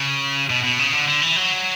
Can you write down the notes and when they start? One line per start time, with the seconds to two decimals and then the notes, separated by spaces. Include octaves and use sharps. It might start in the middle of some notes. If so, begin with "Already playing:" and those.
Already playing: C#3
0.50 B2
0.64 B2
0.79 C#3
0.93 D3
1.08 D3
1.22 E3
1.36 F#3